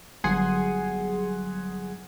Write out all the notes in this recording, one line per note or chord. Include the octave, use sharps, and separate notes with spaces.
G1 F#3 G#4 F#5 G#5 C6